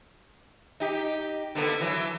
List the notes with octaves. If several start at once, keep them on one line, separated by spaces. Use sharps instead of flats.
D#4 G4
D3 A#3 B3
E3 F#3